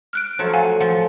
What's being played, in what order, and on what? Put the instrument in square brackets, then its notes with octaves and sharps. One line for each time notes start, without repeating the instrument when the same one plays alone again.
[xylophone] F6 F#6 D7
[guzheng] F3 F#3 A3
[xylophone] F5 F#5 G#5
[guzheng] F3 [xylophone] F#5